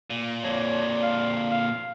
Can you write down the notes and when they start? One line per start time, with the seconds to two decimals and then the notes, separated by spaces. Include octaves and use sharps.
0.10 A#2
0.44 F2 A#2 C#5 D5
1.03 F5
1.51 F5